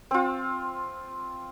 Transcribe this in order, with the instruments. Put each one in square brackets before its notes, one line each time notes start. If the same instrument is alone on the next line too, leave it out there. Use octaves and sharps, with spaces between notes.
[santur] C4 F4